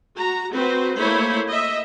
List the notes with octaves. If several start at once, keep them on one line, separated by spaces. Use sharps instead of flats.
F#4 A#5
C4 F#4 B4 C5
A3 A#3 E4 C5 C#5 B5
D#5 E5